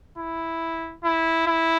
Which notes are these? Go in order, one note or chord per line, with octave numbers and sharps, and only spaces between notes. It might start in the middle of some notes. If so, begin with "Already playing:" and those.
E4
E4
E4